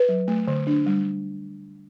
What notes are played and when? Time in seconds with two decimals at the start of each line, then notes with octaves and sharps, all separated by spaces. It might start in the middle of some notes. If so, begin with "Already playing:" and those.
Already playing: B4
0.09 F#3
0.28 A3
0.48 D3
0.67 D4
0.86 G3